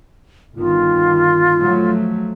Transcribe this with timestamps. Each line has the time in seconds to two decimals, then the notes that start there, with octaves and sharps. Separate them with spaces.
0.57 G1 D#3 F4
1.58 F3 F#3 A3